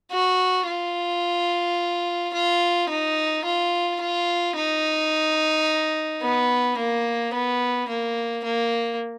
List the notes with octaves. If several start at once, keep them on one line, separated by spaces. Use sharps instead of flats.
F#4
F4
F4
D#4
F4
F4
D#4
B3
A#3
B3
A#3
A#3